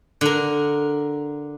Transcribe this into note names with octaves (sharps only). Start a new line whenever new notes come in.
D3 A#4